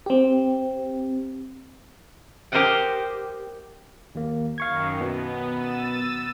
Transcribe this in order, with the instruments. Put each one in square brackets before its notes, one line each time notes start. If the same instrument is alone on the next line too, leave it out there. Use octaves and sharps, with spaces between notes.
[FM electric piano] C4 G4
[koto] G4 A#4 C5 D#5 F#5 G5
[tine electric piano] D#2 A#3
[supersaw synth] F#2 D#3 [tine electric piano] F5 C#6 G#6
[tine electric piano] B2 [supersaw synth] B3
[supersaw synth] E6 A6 D#7